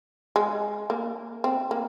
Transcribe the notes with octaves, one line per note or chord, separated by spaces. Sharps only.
G#3
A#3
C4
A#3